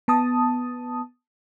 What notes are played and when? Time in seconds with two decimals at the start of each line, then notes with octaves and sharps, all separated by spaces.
0.08 B3 A5 D#6